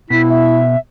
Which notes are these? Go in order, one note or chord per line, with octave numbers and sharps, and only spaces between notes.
B2 E4 B6
E5